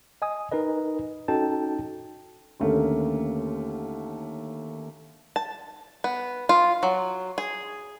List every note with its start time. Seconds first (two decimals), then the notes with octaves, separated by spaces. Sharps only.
0.22 D#5 G#5 D#6
0.51 D#4 A#4 B4 D#5
1.28 C#4 D#4 F#4 A4 G5 A5
2.60 D#2 D3 A3 A#3 C#4
5.36 A5
6.04 B3
6.49 F4
6.83 F#3
7.38 G#4